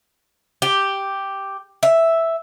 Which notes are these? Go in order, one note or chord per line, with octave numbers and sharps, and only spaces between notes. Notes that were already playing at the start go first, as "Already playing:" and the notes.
G4
E5